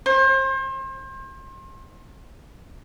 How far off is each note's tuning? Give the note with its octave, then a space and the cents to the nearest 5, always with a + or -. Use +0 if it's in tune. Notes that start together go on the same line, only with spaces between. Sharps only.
C5 +35